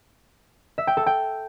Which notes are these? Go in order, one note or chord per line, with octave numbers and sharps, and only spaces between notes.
E5
G5
A4
G5